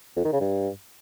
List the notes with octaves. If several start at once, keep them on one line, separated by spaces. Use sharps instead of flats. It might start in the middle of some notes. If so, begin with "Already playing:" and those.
F2
D#3
C#3
G2